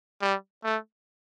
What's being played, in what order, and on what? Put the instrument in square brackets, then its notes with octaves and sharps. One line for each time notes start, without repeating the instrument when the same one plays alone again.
[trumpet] G3
A3